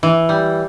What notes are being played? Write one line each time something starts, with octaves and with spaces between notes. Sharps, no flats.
E3
G3